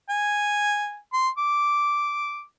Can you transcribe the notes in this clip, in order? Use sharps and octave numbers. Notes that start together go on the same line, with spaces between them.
G#5
C6
D6